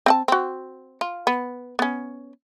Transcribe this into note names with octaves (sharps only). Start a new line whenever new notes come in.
C4 F#5 A5
C4 F#4
F4
B3
B3 C#4